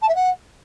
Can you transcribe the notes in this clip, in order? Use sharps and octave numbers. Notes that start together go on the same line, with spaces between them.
A5
E5
F#5